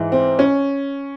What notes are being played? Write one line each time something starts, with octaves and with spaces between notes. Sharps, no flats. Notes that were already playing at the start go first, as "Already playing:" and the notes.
Already playing: G#2 E3
C4
C#4